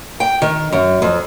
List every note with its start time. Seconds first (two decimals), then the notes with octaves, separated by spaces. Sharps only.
0.20 G5
0.42 D#3
0.72 F#2
1.02 F2